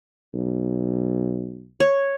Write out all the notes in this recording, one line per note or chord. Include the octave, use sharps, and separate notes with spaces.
B1
C#5